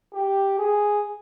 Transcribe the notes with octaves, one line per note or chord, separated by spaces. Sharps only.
G4
G#4